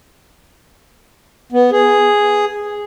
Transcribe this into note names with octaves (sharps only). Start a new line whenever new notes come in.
B3
G#4